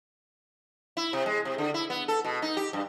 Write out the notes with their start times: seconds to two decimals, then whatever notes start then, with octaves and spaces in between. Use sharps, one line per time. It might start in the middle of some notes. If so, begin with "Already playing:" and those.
0.97 E4
1.13 C3
1.26 G#3
1.45 C3
1.58 D3
1.74 E4
1.90 B3
2.08 A4
2.25 B2
2.42 D#4
2.57 G4
2.73 G2